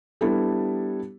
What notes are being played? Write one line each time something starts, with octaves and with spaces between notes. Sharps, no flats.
G3 B3 D4 E4 A4